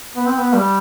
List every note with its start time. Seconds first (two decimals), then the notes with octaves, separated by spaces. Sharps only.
0.16 B3
0.27 C4
0.38 B3
0.54 G3